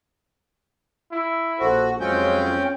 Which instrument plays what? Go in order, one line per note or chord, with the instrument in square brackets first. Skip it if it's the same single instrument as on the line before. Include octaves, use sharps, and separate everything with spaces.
[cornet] E4
[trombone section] A#1 A4 C5 [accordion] F#4
[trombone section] F2 F#3 F4 [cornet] G#3 [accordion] C4 C#4 G5